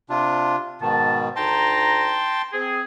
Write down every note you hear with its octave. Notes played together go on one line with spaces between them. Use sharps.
C3 D4 F4
G#2 B2 D#3 A5
D2 D#4 G5 A5 A#5 C6
C4 G#4